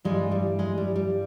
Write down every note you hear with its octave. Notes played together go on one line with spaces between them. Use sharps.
G2 E3 G3 G#3
G3
G#3
G3
G3